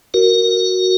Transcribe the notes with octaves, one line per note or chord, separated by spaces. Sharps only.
F#4 A#4